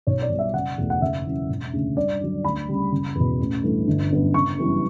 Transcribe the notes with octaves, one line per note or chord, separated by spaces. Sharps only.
B1 C#5
D5
B2 G3
E5
F#1 F#5
E2 B2 A3
F#5
F#1 E5
F#2 E3
E1
D2 C#3
G2 D5
D3 F#3
D2 B5
C#3 G3
F#1
E2
B2
A1
G2 E3 A3
G1
F#2 D3 G3 B3
F#1 C#6
F#2 E3 G3 B3